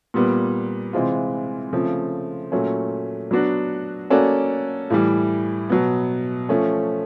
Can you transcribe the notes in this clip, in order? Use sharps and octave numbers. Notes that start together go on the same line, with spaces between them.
A#2 G3 B3
C3 E3 G#3 C4 F4
C#3 F3 A3 C4
A#2 F#3 A3 C#4
F#3 B3 D4 F#4
A#3 C#4 F#4 A4 D5
A2 E3 G3
B2 F#3 B3
F3 A3 C#4